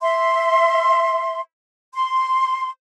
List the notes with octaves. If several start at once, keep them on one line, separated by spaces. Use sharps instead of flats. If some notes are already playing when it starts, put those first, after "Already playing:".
E5 C6
C6